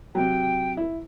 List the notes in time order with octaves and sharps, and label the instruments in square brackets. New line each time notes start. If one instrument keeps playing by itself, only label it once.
[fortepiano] C3 F#3 [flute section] G5
[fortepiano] E4